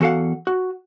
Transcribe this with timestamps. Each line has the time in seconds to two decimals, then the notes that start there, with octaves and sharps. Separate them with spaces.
0.01 E2 F#4 A4 F5 F#5
0.47 F#4